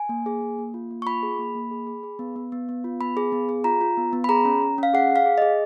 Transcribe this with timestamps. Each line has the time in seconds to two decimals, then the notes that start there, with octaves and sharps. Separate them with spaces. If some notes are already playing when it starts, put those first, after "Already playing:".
Already playing: G#5
0.09 A#3
0.26 G#4
0.41 A#3
0.59 A#3
0.74 F4
0.91 A#3
1.02 C#6
1.06 F4 B5
1.23 G#4
1.39 A#3
1.55 A#3
1.71 G#4
1.87 G#4
2.03 G#4
2.19 B3
2.36 B3
2.52 B3
2.69 B3
2.84 F4
3.01 B3 B5
3.17 G#4
3.32 B3
3.49 G#4
3.64 F4 A#5
3.81 F4
3.97 B3
4.13 B3
4.24 B5
4.29 G#4 A#5
4.45 C#4
4.62 C#4
4.78 C#4 F5
4.93 G#4 F#5
5.11 G#4
5.16 F5
5.26 G#4
5.38 G#4 D#5